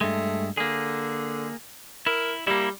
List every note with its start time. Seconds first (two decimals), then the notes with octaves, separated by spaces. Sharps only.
0.01 G2 G#3 A3
0.57 D3 A#3 G#4
2.07 E4 A#4
2.47 G3 A#3 E4